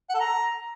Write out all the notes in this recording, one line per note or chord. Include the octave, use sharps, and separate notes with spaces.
F#5
A4
A#5